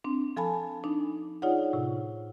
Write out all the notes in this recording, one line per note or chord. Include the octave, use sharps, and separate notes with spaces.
C4 D4
F3 A4 G#5 A5 B5
D4 D#4
D#4 F4 G#4 C#5 D5 F#5
A2 C3